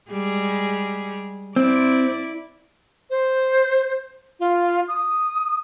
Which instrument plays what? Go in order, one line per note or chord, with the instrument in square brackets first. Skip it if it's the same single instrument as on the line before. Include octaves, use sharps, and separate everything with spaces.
[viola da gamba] G3 G#3 G#4
[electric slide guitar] C4 [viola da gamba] E4 D5
[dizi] C5
F4
D#6